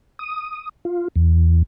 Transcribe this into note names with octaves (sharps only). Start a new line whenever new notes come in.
D#6
F4
E2